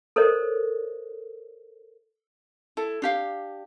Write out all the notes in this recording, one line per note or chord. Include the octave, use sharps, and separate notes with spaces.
A4 A#4 C5 C#5 D#5
E4 A4
D4 G4 F5